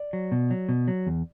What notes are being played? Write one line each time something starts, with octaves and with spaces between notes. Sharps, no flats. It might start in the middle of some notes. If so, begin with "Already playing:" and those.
Already playing: D5
F#3
B2
F#3
B2
F#3
E2